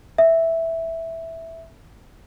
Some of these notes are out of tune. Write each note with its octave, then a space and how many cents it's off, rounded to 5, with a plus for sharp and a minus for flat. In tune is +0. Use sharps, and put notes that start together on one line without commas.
E5 -5